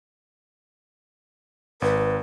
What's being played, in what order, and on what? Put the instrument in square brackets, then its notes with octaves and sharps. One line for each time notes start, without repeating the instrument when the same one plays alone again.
[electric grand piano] G#1 [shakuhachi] B4